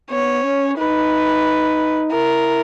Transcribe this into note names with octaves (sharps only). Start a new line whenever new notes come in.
B3 C#5
C#4
D#4 B4
E4 A#4